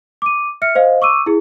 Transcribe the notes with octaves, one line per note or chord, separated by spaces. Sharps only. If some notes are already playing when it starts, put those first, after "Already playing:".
D6 D#7
E5 F6 C#7
C5 D#5 F5
C#6 D6 E6 D#7
E4 G#4